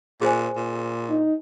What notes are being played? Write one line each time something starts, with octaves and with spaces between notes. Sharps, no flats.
A#2 G#4 C5 G#5
A#2
D#4